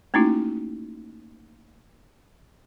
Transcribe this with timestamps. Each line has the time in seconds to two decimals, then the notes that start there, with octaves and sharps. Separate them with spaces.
0.14 A3 A#3 C#4 D#4 E4 F#4